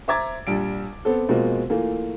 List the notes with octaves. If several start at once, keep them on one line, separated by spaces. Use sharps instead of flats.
C5 E5 A#5 D6 G#6 A6
A#1 G3 D7
B3 C4 A4
B2 F3 G#3 A#3 C4
E3 A3 A#3 F4